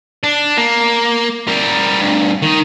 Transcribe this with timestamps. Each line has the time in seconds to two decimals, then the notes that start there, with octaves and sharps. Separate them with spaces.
0.23 D4
0.57 A#3
1.48 G3 A#4
2.01 D2 G2
2.42 D#3 D#4